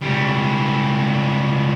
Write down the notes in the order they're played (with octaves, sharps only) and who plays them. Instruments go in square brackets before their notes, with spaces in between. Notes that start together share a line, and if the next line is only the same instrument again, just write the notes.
[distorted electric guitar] C#2 G3